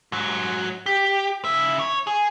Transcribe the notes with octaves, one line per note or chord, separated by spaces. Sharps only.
G#2 F#3
G4
C#3 E5
C#5
G#4